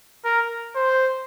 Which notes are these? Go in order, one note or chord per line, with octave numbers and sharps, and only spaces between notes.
A#4
C5